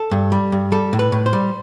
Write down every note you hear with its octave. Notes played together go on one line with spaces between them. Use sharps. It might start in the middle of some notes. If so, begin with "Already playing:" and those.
Already playing: A4
G2
G3
G2
G3 A4
A2
B4
A2
C5
G3